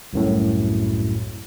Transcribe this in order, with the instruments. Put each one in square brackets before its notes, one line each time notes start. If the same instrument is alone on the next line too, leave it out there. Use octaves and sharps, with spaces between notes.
[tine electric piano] C2 F#2 A2